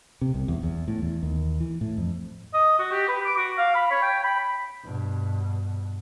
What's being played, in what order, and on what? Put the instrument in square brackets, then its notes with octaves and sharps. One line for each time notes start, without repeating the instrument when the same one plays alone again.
[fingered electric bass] C3
C2
E2
E2
A2
E2
D#2
E3
A2
F2
[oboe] D#5
F#4
G4
B4
D6
F#4
F5
B5
C#5
G5
B5
[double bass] G2 B2